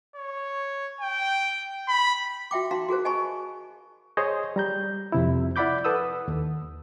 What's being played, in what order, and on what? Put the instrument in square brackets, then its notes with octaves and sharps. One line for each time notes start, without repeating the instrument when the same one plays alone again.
[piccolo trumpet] C#5
G5
B5
[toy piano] F#4 E5 G5 D6
D#4 F#4 F5 A#5 C6
F#4 G#4 A#4 C5
D#5 G#5 A5 B5 C#6
[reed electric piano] G#4 C5 C#5 D#5
G3 A#5 G6
F2 C3 E4
E4 D5 F#5 B5 D6 G6
A4 B4 F#5 D#6 E6
D#2